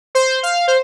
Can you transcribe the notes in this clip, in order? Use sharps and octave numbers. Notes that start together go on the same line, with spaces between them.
C5
F5
C5